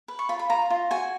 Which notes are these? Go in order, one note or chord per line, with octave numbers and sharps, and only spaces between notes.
B4
C#6
F4 B5
B5
F4 A#5
F4
F#4 G#5